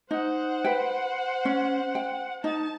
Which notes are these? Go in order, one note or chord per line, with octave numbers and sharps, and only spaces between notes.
D#4 C5 F#5
B4 G5
C#4
G5
D#4 A5